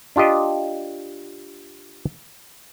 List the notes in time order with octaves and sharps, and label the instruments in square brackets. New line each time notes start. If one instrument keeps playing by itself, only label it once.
[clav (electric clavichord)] D4 F4 G4 D#5